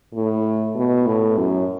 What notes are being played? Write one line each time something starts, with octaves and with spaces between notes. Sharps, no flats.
A2
B2
A2
F#2